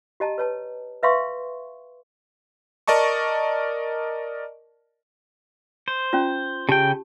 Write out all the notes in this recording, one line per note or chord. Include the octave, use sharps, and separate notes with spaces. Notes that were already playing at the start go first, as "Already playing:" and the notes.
G4 D#5 A5 A#5
B4 C#5 A5
B4 E5 F5 C6 C#6
A#4 D5 D#5 A5 C#6
C5
C#4 F4
C#3 G4 G5 A5